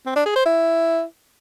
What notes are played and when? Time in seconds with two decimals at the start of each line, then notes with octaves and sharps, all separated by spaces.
0.06 C4
0.16 D4
0.26 G#4
0.36 C5
0.46 E4